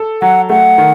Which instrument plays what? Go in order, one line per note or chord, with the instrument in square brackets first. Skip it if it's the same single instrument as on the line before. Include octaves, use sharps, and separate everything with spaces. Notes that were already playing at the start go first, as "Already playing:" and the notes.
Already playing: [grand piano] A4
[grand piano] F#3 [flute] F#5
[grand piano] A3 [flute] F#5
[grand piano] D#3